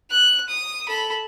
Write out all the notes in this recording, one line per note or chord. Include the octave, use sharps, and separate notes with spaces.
F#6
D#6
A4 B5